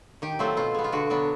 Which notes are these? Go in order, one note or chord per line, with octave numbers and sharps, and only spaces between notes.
D#3 G4
F#3 A3 C4 F4
B2 F4
G#3 B3
F4
D3 F#4
F#3 B3 D4